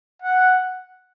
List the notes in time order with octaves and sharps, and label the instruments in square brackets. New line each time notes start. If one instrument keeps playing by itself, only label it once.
[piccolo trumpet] F#5